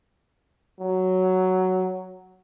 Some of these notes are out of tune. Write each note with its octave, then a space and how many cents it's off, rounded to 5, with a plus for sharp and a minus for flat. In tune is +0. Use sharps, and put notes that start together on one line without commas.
F#3 +5